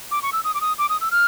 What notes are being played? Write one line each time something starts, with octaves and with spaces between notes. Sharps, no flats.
D6
C#6
E6
D#6
D6
D#6
D6
D#6
E6
F6